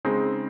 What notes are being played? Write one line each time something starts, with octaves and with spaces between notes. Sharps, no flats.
C#3 G#3 C4 D#4